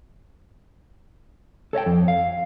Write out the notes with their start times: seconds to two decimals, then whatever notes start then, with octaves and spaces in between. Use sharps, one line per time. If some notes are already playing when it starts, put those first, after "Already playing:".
1.73 A4 C#5 D#5 G5
1.86 F2
2.08 F5